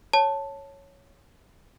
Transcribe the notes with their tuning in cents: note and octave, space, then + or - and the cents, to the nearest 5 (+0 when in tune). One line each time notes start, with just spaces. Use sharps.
C#5 +0 A5 +0